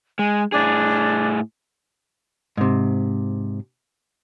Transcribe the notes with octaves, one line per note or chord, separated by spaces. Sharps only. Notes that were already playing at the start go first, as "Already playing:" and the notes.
G#3 G#5
A2 D4 G#4
G#2 C3